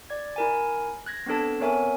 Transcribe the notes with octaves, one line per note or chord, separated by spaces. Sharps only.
D5 G#6
E4 A#4 G#5
F#6 G#6 A#6
B3 C4 D4 A4 A5
B3 C4 A#4 C#5 E5 G#5